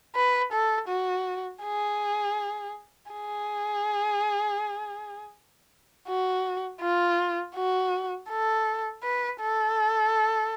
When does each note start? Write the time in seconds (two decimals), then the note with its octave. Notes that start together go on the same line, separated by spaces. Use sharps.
0.15 B4
0.52 A4
0.89 F#4
1.64 G#4
3.12 G#4
6.08 F#4
6.81 F4
7.55 F#4
8.30 A4
9.03 B4
9.41 A4